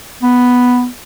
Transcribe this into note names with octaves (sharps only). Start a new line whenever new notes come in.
B3